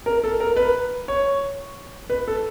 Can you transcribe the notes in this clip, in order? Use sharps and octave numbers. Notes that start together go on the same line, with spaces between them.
A#4
A4
A#4
B4
C#5
B4
A4